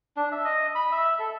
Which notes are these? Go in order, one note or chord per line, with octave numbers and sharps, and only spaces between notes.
D4
E5
D#5
B5
E5
A4